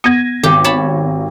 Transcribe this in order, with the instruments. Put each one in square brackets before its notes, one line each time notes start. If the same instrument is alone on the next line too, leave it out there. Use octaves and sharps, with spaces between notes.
[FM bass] B3 [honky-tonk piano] G#6 A#6 D#7
[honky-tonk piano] G#1 [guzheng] G4
[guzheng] C#5 A5 B5